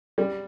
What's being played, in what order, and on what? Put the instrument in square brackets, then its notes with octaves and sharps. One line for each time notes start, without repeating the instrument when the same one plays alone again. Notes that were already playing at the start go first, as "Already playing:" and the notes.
[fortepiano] G3